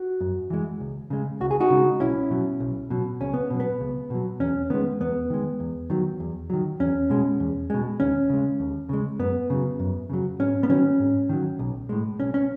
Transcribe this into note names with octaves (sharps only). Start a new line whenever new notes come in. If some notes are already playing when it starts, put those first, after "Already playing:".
Already playing: F#4
F#2
E3 G#3
C#2
C#3 G#3
C#2 F#4
G#4
D#4 F#4
C#3 G#3
B1 C#4 E4
B2 F#3
B1
B2 F#3
C#2 C#4
B3
B2 F#3
B3
C#2
B2 F#3
E2 C#4
D#3 G#3 B3
E2 B3
D#3 G#3
E2
D#3 F#3
E2
D#3 F#3
E2 C#4
B2 G#3
E2
B2 G#3
D#2 C#4
C#3 G#3
D#2
C#3 G#3
F#2 B3
C#3 F#3
F#2
C#3 F#3
G#2 C#4
B3
D#3 F#3 C#4
G#2
D#3 F#3
B1
A2 G#3
B1 C#4
C#4